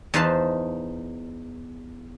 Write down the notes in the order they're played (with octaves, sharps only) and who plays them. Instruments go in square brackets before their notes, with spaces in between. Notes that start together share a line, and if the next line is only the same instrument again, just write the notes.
[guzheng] E2 D#4 B4 C5 F5 A5